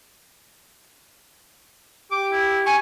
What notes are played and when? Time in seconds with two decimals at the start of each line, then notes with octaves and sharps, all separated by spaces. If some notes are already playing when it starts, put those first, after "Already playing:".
2.11 G4 D6
2.32 E4
2.66 G#5 C#6